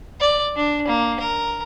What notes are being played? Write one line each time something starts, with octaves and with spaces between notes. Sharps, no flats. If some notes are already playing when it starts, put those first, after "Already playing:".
D5
D4
A#3
A#4